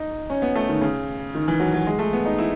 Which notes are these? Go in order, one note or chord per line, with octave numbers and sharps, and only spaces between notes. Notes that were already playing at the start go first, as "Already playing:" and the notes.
Already playing: D#4
C#4
B3
A3
D#3
C#3
D#3
E3
F#3
F#3
G#3
A3
B3
D#4
E4